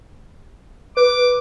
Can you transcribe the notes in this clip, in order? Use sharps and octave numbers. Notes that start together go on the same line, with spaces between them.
B4 D6